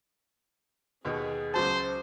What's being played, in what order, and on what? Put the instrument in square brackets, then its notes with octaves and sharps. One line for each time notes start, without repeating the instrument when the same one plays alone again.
[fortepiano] D#2 B2 [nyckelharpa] G#4
[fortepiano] C#2 F#3 A5 [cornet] C5